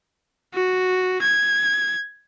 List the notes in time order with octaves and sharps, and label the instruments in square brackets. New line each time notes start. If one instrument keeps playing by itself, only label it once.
[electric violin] F#4
G#6